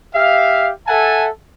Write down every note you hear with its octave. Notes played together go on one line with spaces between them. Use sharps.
G4 E5 F5
A4 E5 F#5 G#5 A5